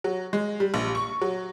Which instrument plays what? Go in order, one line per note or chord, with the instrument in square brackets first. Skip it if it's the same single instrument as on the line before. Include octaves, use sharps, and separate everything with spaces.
[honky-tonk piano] F#3
G#3
G3
A#1
C#6
F#3